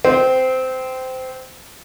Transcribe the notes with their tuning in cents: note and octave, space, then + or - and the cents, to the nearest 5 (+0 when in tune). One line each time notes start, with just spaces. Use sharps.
C4 -15